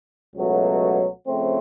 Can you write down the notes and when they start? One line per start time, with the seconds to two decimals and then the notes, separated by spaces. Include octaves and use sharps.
0.35 C#2 B2 F#3 A3
1.27 C#3 F3 A3 C4